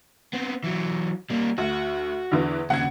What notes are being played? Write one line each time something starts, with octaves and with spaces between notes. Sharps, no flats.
B3 C4
E3 F#3
G3 A#3
D2 F#4
E2 D3 E3
D#2 C#3 F#5 G#6